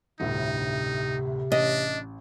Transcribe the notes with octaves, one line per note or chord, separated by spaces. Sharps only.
G1 D2 A2 C3 D#4
A1 D4 D#5